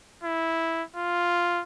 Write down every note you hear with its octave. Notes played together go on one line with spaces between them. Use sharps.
E4
F4